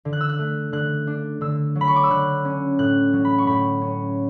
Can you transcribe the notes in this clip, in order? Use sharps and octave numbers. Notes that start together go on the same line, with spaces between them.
D3
F#6
E6
F#6
A3
D3 F#6
D4
D3 E6
F#3
B5
C#6
D6
E6
D3 F#6
C#4
A2 F#6
F#3
B5
C#6
A2 B5
C#4